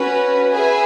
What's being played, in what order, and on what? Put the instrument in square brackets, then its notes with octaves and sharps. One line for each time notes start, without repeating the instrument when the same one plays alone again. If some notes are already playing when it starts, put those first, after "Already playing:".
Already playing: [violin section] C#4 F#4 B4
G#4 B4 E5 G#5